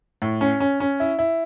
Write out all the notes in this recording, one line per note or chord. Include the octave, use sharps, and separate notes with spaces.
A2
C#4
C#4
C#4
E4
E4